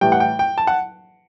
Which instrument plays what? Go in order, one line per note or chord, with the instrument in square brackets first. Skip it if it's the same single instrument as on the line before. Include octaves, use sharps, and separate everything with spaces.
[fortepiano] A2 E3 G3 G5
F#5
G5
G5
A5
F#5